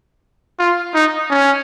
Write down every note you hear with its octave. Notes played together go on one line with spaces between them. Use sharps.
F4
D#4
C#4